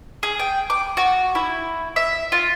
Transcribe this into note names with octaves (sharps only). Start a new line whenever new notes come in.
G#4
G5
D6
F#4
E4
E5
F4